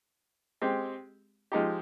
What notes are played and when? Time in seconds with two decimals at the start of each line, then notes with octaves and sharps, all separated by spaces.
0.62 G#3 C4 G4
1.52 F3 G#3 D#4 G4